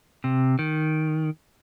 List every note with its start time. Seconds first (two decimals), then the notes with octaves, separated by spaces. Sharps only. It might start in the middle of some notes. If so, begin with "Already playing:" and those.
0.24 C3
0.59 D#3